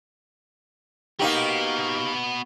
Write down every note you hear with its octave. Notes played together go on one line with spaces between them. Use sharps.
A#3 B3 D#4 F#4 G4